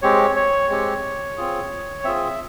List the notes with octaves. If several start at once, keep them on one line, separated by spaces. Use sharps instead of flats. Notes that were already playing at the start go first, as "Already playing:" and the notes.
G#3 C4 G4 C#5
C#5
G#3 C4 G4
C4 F4 G#4
C4 F4 G#4 E5